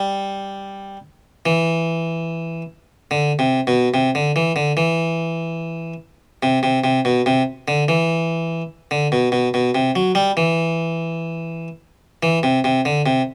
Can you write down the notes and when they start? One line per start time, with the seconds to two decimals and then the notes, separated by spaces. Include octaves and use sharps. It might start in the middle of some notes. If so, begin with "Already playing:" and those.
Already playing: G3
1.46 E3
3.11 D3
3.39 C3
3.67 B2
3.94 C3
4.15 D3
4.36 E3
4.56 D3
4.77 E3
6.43 C3
6.63 C3
6.84 C3
7.05 B2
7.26 C3
7.68 D3
7.88 E3
8.91 D3
9.12 B2
9.32 B2
9.54 B2
9.75 C3
9.96 F#3
10.15 G3
10.37 E3
12.23 E3
12.43 C3
12.64 C3
12.85 D3
13.06 C3